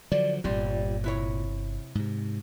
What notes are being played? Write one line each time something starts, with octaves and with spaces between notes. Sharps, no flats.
D3 F3 F#3 D5
G1 C2 A#2 G3 C4 C6
C3 E4 C#5
G#2 C3